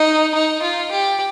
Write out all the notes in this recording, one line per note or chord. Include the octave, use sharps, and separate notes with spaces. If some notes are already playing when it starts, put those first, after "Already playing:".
Already playing: D#4
D#4
F4
G4